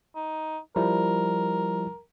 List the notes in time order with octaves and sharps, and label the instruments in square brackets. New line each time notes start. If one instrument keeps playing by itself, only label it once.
[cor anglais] D#4
[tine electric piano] F3 G3 E4 [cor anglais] A#4